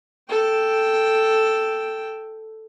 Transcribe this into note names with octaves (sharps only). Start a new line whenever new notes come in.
A4 G5